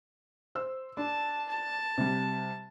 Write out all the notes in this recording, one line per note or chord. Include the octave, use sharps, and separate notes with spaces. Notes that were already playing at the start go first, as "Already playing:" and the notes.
C5 E6
D4 A5
A5
C3 G3